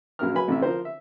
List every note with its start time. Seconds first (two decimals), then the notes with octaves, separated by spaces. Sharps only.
0.19 A#1 F#2 F#3 A#4 F6
0.34 F#3 B4 G#5 B5
0.48 A1 C3 E5
0.62 F3 A#4 C5
0.85 E5